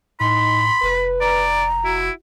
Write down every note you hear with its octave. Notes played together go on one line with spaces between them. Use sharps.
A2 D#4 B5 C6
F1 B4
D5 A#5
E4 F#4